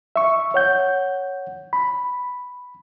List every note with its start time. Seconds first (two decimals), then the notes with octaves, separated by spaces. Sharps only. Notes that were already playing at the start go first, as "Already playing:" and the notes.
0.16 E5 C#6
0.54 C#5 F#5 G6
1.73 B5